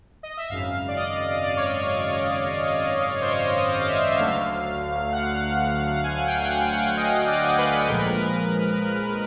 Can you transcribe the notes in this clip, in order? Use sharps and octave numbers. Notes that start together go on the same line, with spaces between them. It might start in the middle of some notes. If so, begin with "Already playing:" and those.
D#5
E5
G#1 F#2 C#3 F5
D5
D#5
D5
C#5
D5
C5
C#5
D#5
F5
E5
E5
D2 D3 F#3 A3 F5
F#5
G#5
G5
F#5
G#5
D#5
D5
B4
A#1 A#2 F3 G#3 A#4
B4
A#4